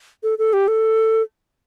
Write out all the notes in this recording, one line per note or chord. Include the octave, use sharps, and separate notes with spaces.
A4
A4
G4
A4